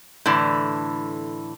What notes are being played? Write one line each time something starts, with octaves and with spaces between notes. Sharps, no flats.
A2 D3 E3